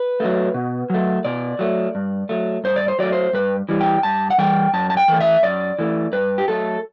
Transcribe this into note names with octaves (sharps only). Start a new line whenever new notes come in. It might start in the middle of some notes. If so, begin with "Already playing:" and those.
Already playing: B4
F#3 A3
B2
F#3 A3
B2 D5
F#3 A3
G2
F#3 A3
G2 C5
D5
C5
F#3 A3 D5
C5
G2 B4
E3 G3
G5
G2 A5
F#5
E3 G3 G5
F#2 A5
A5
G5
E3 A3
E5
F#2 D5
E3 A3
G2 B4
G4
F#3 A3 A4